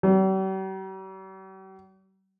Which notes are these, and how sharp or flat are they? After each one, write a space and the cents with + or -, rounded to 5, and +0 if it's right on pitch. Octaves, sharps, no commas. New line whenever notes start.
G3 -45